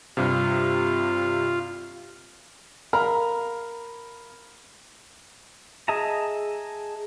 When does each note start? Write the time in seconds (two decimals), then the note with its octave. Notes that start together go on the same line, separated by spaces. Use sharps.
0.17 G2 C3 F4
2.93 A#4 F5 A#5 B5 F6
5.88 G#4 D#5 E5 A5 A#5